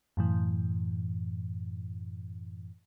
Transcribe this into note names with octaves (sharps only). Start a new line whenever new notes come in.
F#2 A2 E3